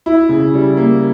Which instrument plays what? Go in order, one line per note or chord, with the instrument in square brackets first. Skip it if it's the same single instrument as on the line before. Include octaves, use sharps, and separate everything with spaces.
[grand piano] E4
C#3
G3
A#3